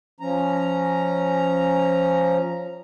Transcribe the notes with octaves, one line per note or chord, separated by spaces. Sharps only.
F3 C#4 A#5